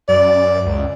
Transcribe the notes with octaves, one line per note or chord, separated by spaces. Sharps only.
F#2 D5
C#2